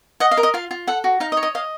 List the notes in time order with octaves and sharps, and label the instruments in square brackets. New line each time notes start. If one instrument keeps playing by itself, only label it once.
[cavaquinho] D#5 F#5
F5
A#4
D#5
F4 F5
F4
A4 F#5
F#4
D#4 F5
D#5
C#5
D#5
D#5 F5